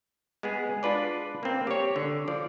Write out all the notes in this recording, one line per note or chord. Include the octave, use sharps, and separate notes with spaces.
G#3 B3 G#4
D4 F4 B4 D5
A#3 C4
G4 C#5
D3
F3 D5